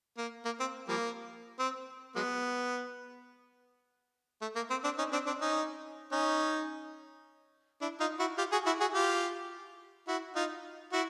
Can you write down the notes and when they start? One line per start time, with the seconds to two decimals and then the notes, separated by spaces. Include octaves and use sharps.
0.18 A#3
0.45 A#3
0.60 C4
0.88 F3 G3 A#3
1.59 C4
2.15 F#3 G#3 B3
4.42 A3
4.56 A#3
4.70 C4
4.84 C4 D4
4.98 C#4 D#4
5.12 C4 D4
5.27 C4 D4
5.41 C#4 D#4
6.12 C#4 D#4
7.81 D4 E4
8.00 D#4 F4
8.19 E4 F#4
8.37 F4 G4
8.52 F#4 G#4
8.66 E4 F#4
8.80 F#4 G#4
8.94 F4 G4
10.08 E4 F#4
10.36 D#4 F4
10.92 E4 F#4